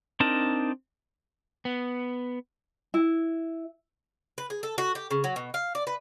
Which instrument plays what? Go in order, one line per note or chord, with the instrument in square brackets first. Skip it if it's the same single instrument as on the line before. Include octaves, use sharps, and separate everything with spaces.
[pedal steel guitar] C4 D4 D#4 A#4 A5
[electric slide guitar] B3
[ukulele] E4
[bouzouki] B4
G#4
A4
F#4
G4
C#3
F#3
B2
F5
D5
B4